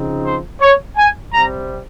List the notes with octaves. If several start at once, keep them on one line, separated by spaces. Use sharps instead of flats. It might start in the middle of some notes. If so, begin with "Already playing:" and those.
Already playing: C#3 F3 C4 D#4
C5
C#5
G#5
C3 G3 C4 A#5